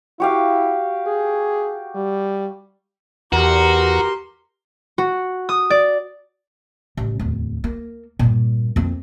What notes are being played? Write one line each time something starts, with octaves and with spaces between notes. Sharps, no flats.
E4 F#4 G4 F5
G#4
G3
E2 F#4 G4 A#4 A#5 C6
F#4
D#6
D5
A1 C#3
D1 E2
A#3
G2 A#2
F2 A#3